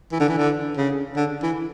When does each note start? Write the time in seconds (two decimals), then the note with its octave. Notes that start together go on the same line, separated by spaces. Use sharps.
0.12 E3
0.20 D3
0.29 E3
0.38 D3
0.77 C#3
1.17 D3
1.43 E3